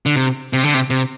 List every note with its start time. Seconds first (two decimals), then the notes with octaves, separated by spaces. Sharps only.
0.06 D3
0.16 C3
0.53 C3
0.63 D3
0.74 C3
0.90 C3